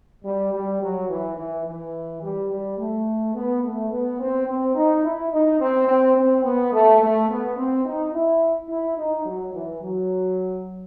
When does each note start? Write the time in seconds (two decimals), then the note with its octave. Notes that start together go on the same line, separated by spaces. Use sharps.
0.25 G3
0.53 G3
0.82 F#3
1.10 E3
1.37 E3
1.66 E3
2.23 G3
2.50 G3
2.78 A3
3.34 B3
3.63 A3
3.91 B3
4.20 C4
4.47 C4
4.75 D#4
5.03 E4
5.32 D#4
5.60 C4
5.88 C4
6.16 C4
6.44 B3
6.73 A3
7.00 A3
7.29 B3
7.56 C4
7.85 D#4
8.13 E4
8.69 E4
8.97 D#4
9.26 F#3
9.54 E3
9.82 F#3